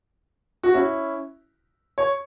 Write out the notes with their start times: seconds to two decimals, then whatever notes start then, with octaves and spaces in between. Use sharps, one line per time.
0.63 F#4
0.74 C#4 E4
1.98 C#5